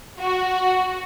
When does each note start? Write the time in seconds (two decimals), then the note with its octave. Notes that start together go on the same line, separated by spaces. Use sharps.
0.20 F#4